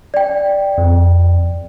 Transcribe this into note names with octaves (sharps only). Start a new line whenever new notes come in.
D5 G5
F2